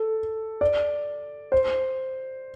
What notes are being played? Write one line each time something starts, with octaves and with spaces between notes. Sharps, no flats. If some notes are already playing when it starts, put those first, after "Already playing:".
Already playing: A4
D5
C5